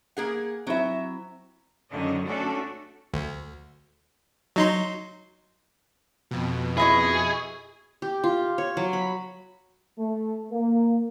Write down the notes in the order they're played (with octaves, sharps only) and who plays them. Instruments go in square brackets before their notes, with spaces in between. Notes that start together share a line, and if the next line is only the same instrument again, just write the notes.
[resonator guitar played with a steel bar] A#3 G#4 F#5
[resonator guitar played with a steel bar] F#3 E5 [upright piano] C4 E4
[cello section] F#2 D3 D#3 D#5
A3 C#4 D4 F#4 A4
[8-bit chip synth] D2
F#3 D#4 C6
[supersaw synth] F2 B2
[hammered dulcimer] E4 D#5 C#6 [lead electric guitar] G#4
[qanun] G4
F4
C#5
F#3
B5
[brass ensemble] A3
A#3